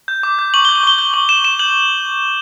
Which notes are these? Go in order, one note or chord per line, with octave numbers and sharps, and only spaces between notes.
G6
D6
G6
C#6 F#7
G6 G7
F#7
C#6 G7
G6 G7
C#6 F#7
G6 E7
C#6 E7
G6 F#7